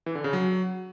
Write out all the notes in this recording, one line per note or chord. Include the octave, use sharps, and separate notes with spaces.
E3
D3
C#3
F#3